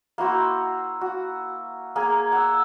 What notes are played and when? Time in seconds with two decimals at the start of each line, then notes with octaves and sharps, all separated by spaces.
0.18 A#3 E4 F#4 C5
1.01 F#4
1.96 A#3 G#4 A#4 G#5
2.32 F#5 E6